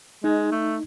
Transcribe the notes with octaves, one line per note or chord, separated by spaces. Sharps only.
G#3 D#4
A3